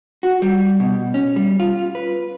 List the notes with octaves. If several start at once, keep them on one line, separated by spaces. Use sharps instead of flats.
F#4
G3
B2
C#4
G3
F4
B4